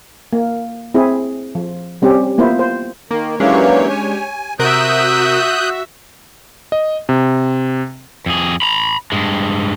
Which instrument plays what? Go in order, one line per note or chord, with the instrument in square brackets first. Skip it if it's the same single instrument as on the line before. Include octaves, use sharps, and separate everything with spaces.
[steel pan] A#3
C4 E4 G#4
F3
G3 C4 C#4 G4
A#3 B3 E4 F4 C5
C5
[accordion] D#3 [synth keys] A#3
[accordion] E3 F#3 A#3 [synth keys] G#3 C#4 D4 [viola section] G4 C#5
[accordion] G#5
[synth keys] C3 A#4 D7 [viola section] F#4 E5 [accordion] D#6 F#6 G6
[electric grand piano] D#5
C3
[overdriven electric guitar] F2 G#4
A#5 B5
G2 G#3